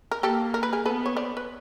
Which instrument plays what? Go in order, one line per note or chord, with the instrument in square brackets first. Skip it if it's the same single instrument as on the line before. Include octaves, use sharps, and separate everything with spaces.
[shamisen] A#4
[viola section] A#3 [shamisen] G4 A4
[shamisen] A#4
B4
G#4 A#4
[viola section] B3 [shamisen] A4 B4
[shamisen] C#5
C5 D5
B4